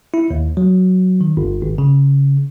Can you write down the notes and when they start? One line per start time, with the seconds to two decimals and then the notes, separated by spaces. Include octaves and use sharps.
0.14 E4
0.30 D#2
0.57 F#3
1.21 D#3
1.37 G1
1.62 G#1
1.78 C#3